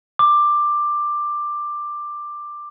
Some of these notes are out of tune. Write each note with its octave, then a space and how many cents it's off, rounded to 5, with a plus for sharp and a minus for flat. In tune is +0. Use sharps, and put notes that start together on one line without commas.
D6 +10